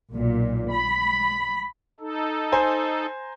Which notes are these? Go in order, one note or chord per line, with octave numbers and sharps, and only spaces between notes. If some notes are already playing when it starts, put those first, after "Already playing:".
B1 A#2
B5
D#4 A4
C5 G#5 A#5